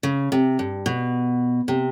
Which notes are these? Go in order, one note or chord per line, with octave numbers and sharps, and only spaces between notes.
C#3
C3
G2
B2
C3